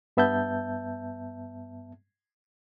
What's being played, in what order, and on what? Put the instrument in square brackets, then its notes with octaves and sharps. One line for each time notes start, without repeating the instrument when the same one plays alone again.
[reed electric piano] G2 B3 E5 A5 G6